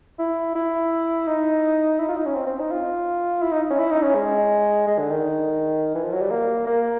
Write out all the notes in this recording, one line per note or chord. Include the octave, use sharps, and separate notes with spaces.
E4
E4
D#4
E4
F4
D#4
C#4
C4
C4
D#4
F4
E4
D#4
C#4
E4
D#4
C#4
G#3
G#3
D3
D#3
E3
F3
F#3
G3
A#3
A#3